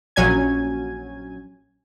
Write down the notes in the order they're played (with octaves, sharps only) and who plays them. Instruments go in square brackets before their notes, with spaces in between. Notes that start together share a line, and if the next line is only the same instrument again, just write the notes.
[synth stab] A#1 F#3 C#4 G#5 G#6